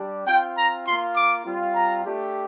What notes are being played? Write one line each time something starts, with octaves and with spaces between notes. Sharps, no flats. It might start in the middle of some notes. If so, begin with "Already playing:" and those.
Already playing: G3 D4 G4
C4 F4 G5
A#5
A#3 F4 C6
D6
G3 C4 F4
A#5
A3 D4 G4